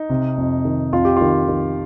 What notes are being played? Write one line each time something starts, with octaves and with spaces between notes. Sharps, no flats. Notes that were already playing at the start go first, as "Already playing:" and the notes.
Already playing: D#4
C3
F2
D#3
F2 F4
G4
D#3 F4
D#3